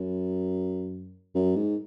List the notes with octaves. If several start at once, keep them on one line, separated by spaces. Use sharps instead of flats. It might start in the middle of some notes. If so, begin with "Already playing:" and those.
Already playing: F#2
F#2
G#2